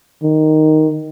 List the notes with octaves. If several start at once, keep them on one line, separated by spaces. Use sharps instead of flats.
D#3